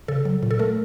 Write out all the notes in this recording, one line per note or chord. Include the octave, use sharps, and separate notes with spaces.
C#3 A4
F#3
A#2
A4
A3 A#4